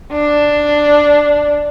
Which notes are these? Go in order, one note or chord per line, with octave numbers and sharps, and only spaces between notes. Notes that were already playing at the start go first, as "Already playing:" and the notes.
D4